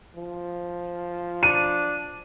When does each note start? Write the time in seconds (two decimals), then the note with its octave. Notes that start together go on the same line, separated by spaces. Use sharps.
0.16 F3
1.43 D4 D#7